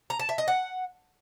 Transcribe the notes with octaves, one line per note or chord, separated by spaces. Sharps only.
A#5
A5
E5
D#5
F#5